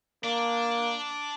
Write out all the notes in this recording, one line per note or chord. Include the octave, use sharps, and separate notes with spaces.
A#3 D4